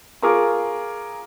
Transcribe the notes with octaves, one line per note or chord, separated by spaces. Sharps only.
F4 G#4 A#4 C#6 D6